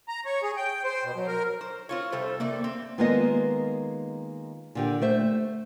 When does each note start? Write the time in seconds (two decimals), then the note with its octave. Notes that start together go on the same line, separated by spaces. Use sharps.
0.08 A#5
0.25 C#5
0.43 G#4
0.57 G5
0.84 C5
1.04 B2
1.16 F#3
1.28 A#4
1.61 C5
1.89 C4 F4 C#5
2.12 C3 G3 A4 C5
2.40 C3 A3 A#3 D5
2.64 C4
2.98 D#3 G#3 A#3 B3 F4 D#5
4.75 A#2 D3 G4
5.02 A3 C5 E5